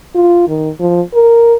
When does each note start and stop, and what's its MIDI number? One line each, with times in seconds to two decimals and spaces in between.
0.15 0.44 65
0.48 0.70 51
0.80 1.01 53
1.14 1.56 70